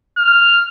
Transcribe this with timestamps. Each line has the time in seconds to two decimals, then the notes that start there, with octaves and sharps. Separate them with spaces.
0.17 F6